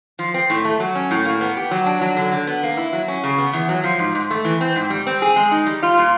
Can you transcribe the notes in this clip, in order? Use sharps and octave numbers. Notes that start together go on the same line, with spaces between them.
F3
C4
A2
A3
F#3
C#4
A2
A#3
B3
G4
F#3
D4
F#3
D3
D3
B3
A#3
E4
F#3
C#4
C#3
B3
E2
F#3
F3
G#2
G#2
A3
E3
C4
G#2
G3
C4
G#4
G#3
D#4
G3
F4
A#2